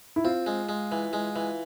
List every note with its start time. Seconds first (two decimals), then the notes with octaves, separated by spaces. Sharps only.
0.16 E4
0.24 C4 F4
0.46 G#3
0.69 G#3
0.92 E3
1.13 G#3
1.36 E3